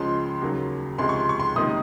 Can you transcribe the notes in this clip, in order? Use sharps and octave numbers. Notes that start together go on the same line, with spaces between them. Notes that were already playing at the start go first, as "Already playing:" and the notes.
Already playing: C#2 C#3 F3 G#3 C6
D#2 C#3 F#3 A#3
C#2 C3 F3 G#3 C6
C#6
C6
C#6
C6
C#2 C3 D#3 A#3 D#6